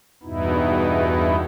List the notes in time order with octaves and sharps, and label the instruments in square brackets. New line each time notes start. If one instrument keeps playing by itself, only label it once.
[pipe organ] E2 G2 B2 B3 D#4 E4